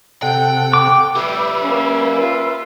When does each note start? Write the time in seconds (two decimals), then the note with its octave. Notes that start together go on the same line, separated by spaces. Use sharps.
0.23 C3 A4 F#5 G5
0.73 D6
1.16 F#3 G4 B4 E5
1.62 A#3 C#4
2.20 F4